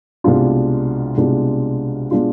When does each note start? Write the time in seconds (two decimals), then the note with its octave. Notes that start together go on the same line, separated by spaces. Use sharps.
0.24 C2 B2 G#3 D4 F4
1.17 C2 B2 G#3 D4 F4
2.11 B2 G#3 D4 F4